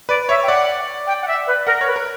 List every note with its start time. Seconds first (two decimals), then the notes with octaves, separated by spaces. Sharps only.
0.09 B4 D5
0.29 C#5 E5
0.43 G5
0.48 D5 F#5
1.07 G5
1.22 F#5
1.28 E5
1.47 B4
1.67 A#4 F#5
1.81 C#5
1.86 B4
1.96 A#4